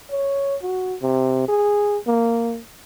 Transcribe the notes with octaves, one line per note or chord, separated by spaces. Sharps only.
C#5
F#4
C3
G#4
A#3